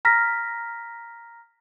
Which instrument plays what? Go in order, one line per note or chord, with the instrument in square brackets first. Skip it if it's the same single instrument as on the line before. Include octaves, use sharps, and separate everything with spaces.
[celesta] A#5 F6 A#6 B6